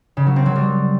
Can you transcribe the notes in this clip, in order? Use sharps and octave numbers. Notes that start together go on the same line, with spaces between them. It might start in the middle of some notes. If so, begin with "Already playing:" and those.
C#3
F#3
C4
F#3
G3